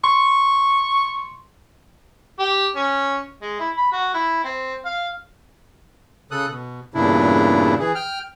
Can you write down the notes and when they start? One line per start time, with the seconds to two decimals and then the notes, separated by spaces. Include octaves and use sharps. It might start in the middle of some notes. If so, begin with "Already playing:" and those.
0.04 C6 C#6
2.39 G4
2.76 C#4
3.42 G#3
3.59 E4
3.77 B5
3.92 F#4
4.14 E4
4.44 C4
4.85 F5
6.31 C#3 A4 D#6 F#6
6.50 B2
6.94 E2 G2 A#2 C#3 D4 E4
7.79 E3 G#4
7.95 G5 F6